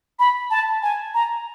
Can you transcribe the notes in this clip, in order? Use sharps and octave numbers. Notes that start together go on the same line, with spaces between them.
B5
A5
G#5
A#5